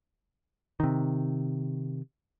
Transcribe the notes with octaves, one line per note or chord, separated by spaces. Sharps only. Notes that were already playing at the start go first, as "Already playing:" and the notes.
C3 D#3